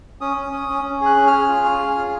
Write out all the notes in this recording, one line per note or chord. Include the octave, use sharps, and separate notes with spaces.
C#4 D#6
C#4
C#4
C#4
C#4
G#4
F#6
C#4
F6
G#4
F4
C#4
G#4
F4